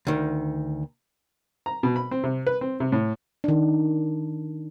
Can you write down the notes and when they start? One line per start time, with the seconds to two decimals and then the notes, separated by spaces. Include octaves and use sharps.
0.07 D2 D#3
1.66 A#5
1.83 B2
1.96 B5
2.11 C4
2.24 C3
2.47 B4
2.61 C4
2.80 C3
2.92 A2
3.44 D#3 D4